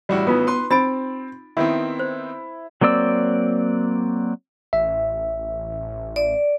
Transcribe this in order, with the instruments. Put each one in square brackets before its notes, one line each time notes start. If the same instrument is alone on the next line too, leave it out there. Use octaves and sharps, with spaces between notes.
[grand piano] A1 E4 F#4 [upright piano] G3
[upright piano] B3 [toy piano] D#4 F4 D#6
[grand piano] B4 C6
[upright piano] C4 [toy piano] D#4 B5 [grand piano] A6 D7
[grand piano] D#3 B3 C4 [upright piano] E4
[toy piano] C5
[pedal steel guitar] F#3 A#3 C4 D5 E6
[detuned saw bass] A1 [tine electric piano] E5
[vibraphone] D5